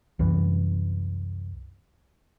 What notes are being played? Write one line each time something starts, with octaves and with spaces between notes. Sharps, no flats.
C2 F#2 E3